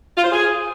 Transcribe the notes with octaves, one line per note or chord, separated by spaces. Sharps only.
F4
C5
G#4